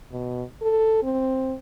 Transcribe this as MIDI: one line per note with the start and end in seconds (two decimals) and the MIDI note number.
0.12 0.43 47
0.62 0.99 69
1.03 1.55 60